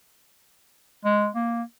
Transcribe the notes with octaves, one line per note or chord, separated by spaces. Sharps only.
G#3
A#3